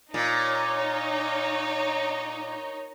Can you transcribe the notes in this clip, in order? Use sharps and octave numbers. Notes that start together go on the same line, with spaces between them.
A#2 D#4 C#5